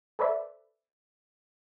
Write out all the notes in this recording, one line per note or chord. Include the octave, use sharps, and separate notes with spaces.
A4 B4 C5 D5 E5